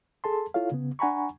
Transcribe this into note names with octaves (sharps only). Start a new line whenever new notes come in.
G#4 A4 A5 C6
E4 F4 A4 C#5 F5
C#3 B3
D4 F#5 G#5 A#5 B5 C#6